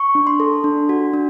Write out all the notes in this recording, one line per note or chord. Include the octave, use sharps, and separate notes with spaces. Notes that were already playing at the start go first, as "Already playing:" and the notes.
Already playing: C#6
D4
C6
A4
D4
F#4
D4